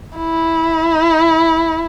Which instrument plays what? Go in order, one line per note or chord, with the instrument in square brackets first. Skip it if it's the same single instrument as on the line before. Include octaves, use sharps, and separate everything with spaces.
[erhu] E4